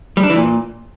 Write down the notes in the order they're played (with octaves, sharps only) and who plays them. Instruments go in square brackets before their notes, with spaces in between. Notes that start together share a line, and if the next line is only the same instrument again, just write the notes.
[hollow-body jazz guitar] G3
D4
E3
A#2